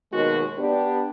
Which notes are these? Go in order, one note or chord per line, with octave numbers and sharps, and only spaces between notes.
D#2 B2 D#3 G#3 B3 F#4
B3 D4 G4